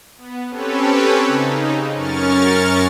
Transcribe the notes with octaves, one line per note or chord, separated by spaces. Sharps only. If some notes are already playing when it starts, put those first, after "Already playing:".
B3
C4 C#4 G4 A4 B4 C#5
C#3 D#4
F#2 C#4 A#4 C#6 F6 A6